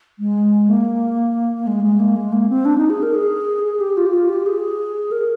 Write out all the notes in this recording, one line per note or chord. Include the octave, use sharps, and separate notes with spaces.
G#3
A#3
G#3
G#3
A#3
G#3
A#3
C4
D4
D#4
G#4
A#4
G#4
G#4
G4
F4
G4
F4
G4
G#4
A#4